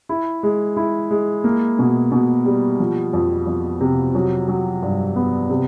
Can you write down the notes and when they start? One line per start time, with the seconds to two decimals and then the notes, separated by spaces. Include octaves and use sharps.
0.09 E4
0.43 G#3
0.77 E4
1.11 G#3
1.44 A#3
1.79 B2
2.12 B2
2.45 G3
2.79 F3
3.13 F2
3.47 F2
3.81 C3
4.15 F#3
4.48 F#3
4.82 G2
5.16 B3
5.50 C3